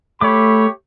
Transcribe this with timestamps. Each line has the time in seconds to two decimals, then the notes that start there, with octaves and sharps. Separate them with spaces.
0.21 A3 G4 C#5 B5 D6